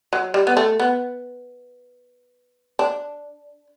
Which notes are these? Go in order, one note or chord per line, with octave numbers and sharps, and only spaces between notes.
F#3
G3
B3
A3
B3
D4